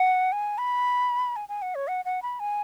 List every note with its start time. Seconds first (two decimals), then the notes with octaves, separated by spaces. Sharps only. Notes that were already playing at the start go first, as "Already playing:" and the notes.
Already playing: F#5
0.32 G#5
0.58 B5
1.36 G#5
1.49 G#5
1.62 F#5
1.75 C#5
1.88 F#5
2.05 F#5
2.22 B5
2.40 G#5